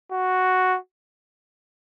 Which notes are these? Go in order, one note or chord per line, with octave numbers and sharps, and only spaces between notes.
F#4